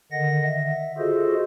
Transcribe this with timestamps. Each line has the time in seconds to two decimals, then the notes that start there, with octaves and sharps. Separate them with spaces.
0.12 D3 D#3 D#5 F#5 A#6
0.44 E5
0.98 F4 F#4 G#4 A4 C5 D#5